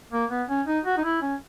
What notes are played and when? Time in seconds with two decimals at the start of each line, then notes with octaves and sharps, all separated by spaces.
0.12 A#3
0.30 B3
0.49 C#4
0.67 D#4
0.86 F#4
0.98 D#4
1.04 E4
1.22 C#4